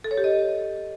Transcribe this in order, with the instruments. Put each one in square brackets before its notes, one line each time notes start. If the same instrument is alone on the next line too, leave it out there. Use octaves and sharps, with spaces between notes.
[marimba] A4
C#5
G4
D#5